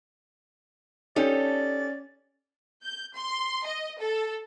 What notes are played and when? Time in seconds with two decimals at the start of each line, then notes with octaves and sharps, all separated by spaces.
1.16 C#4 D#4 G4 A4 D5
2.83 G6
3.14 C6
3.66 D#5
3.99 A4